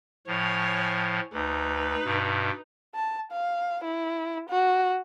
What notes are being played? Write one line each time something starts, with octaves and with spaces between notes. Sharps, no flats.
A2 F3 C#5 G#5
D2 D#4 B4
G2 B2
A5
F5
E4
F#4